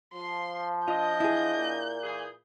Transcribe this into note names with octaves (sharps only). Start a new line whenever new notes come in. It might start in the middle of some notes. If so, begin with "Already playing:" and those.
F3 C6
D4 F4 D#5 G6
E4 G#4
A#2
E3 G#4